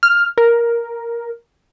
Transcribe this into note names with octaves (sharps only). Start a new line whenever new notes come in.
F6
A#4